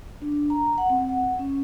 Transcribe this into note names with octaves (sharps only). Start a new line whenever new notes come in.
D4
A#5
F#5
C4
F#5
C#4